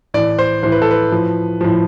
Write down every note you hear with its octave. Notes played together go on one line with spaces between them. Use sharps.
A2 E3 D5
C5
A2 E3 C5
B4
A4
B4
A2 F3
A2 F3